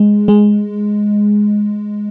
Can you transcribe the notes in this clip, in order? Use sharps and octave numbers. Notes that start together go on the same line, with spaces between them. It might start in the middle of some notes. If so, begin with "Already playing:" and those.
Already playing: G#3
G#3